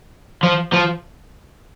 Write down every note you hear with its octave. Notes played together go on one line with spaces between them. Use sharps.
F3
F3